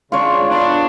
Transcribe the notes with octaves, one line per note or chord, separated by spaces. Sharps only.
C#3 G#3 D4 F4 C#5
B3 D4